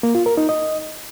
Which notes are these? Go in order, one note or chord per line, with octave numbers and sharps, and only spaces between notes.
A#3
F4
A#4
D#4
D#5